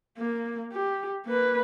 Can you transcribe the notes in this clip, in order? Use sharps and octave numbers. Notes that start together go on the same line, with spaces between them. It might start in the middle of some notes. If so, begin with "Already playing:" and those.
A#3
G4
A#3 B4